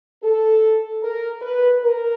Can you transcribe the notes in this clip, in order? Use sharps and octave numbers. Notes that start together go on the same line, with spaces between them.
A4
A#4
B4
A#4